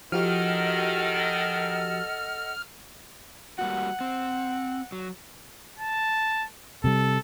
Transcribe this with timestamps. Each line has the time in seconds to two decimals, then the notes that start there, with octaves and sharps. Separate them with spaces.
0.12 D#3 F3 F#4 G4 A4 D#5 F#5 F6
3.59 G3 A#3 F#4 F#5
4.01 C4
4.92 F#3
5.79 A5
6.84 C3 G3 A4